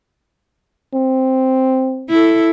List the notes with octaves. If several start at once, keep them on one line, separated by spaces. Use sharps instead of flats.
C4
E4 A4